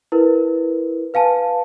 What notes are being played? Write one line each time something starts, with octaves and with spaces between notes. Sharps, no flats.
E4 A#4 B4
B4 F5 G#5 A5